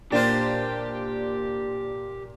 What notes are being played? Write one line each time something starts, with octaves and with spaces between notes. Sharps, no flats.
A#2 D4 F4 G4 C5 G5